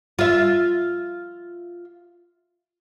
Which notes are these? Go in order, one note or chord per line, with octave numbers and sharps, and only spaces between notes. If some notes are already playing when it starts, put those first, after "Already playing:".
F4 E5